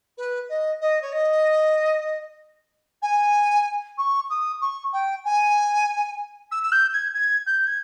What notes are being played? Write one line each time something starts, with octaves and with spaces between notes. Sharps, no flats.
B4
D#5
D#5
C#5
D#5
G#5
C#6
D#6
C#6
G5
G#5
E6
E6
G6
G#6
G#6
G6
G#6